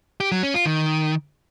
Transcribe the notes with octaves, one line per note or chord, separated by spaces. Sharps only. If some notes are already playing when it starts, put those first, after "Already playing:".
G4
F#3
C#4
F4
D#3